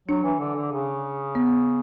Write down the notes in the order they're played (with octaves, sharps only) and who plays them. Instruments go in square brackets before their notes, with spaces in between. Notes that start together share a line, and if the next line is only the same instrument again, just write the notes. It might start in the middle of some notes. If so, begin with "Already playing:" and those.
[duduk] F#3 [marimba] D4
[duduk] E3
D3
D3
C#3
[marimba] B3